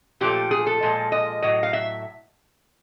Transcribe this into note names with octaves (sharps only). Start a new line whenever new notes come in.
A#2 F3 A3 G4
G#4
A4
A#2 F3 G#3
D#5
A2 F#3 D#5
F5
E5